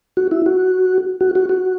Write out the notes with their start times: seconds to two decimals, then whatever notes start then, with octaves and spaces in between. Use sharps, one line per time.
0.17 F#4
0.31 E4
0.46 F#4
1.21 F#4
1.35 F#4
1.49 F#4